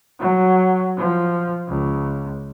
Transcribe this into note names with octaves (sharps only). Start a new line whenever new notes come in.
F#3
F3
C#2